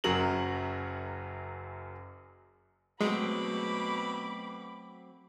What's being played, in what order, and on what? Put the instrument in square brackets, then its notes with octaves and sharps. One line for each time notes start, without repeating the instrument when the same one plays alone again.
[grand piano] F#1 F#2 F#3 F#4 A#4 F#7
[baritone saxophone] B2 [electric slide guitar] F#3 A3 C4 [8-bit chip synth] G#3 [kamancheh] B5 D6